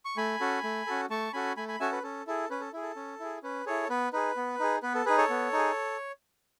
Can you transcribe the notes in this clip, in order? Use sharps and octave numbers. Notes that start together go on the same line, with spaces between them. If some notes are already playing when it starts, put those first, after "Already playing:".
C#6
A3 G#5 B5
C#4 F#4 A4
A3
C#4 F#4 A4
A3 A5 C#6
C#4 F#4 A4 G#5 B5
A3 G#5 B5
G#5 B5
C#4 F#4 A4 E5 G#5
B4
C#4 A4
E4 G#4 A4
C#4 B4
A4
E4 G#4
A4
C#4
E4 G#4
C#4 B4
E4 G#4 A4 C#5
B3 B4
D#4 G#4 B4
B3
D#4 G#4
B3 B4
A4
D#4 G#4 B4
A4 C#5
B3
D#4 G#4